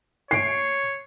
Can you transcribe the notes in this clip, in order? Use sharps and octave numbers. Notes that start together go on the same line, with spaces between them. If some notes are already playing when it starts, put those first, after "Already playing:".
C#5 C7 D7